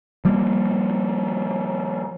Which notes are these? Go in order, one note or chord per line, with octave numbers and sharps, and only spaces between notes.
F3 G3 A#3